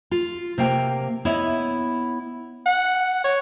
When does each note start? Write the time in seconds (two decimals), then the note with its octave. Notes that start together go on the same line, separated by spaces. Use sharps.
0.11 F4
0.58 C3 A#3 F5 G5
1.25 B3 E4 C#5 D#5 E5
2.66 F#5
3.24 C#5